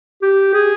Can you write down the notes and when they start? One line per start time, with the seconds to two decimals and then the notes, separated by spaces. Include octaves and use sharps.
0.22 G4
0.53 G#4